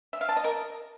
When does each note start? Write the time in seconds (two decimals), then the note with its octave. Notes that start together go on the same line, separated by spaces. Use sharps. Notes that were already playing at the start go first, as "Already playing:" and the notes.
0.13 E5
0.21 F5
0.29 A5
0.36 D#5
0.44 A#4